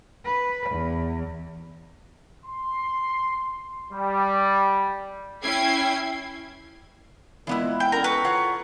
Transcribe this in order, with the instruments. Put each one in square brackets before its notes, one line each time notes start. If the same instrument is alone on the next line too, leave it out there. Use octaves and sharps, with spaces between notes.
[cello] B4
E2
[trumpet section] C6
G3
[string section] C#4 E4 G5 G#6 C7
[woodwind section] A#2 G#3 [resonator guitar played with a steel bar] E3 B3 E4
[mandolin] G5
[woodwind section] D3 C#4 [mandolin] A#4 G5 A#5
[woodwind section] A4 A#5 C#6 [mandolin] B4
[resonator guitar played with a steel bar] F4 C#5 F#5